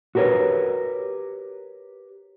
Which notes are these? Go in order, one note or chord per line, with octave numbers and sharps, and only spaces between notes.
F#4 G4 A#4 B4 C#5